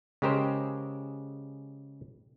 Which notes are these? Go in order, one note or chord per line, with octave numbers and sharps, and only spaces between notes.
C#3 G#3 G4 A#4 C5